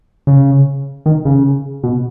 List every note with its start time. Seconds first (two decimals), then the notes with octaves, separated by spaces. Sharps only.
0.27 C#3
1.06 D#3
1.25 C#3
1.83 B2